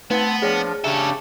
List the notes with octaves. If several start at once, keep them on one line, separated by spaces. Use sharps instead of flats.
A3 B3 C4 B4 A5
F3 D4 G#4 C#5 F6
C#3 C#4 D4 G4 A4 E5